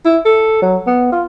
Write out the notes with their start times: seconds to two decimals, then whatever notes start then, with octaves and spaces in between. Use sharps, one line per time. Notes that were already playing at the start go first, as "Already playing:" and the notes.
0.05 E4
0.25 A4
0.62 F#3
0.87 B3
1.12 F4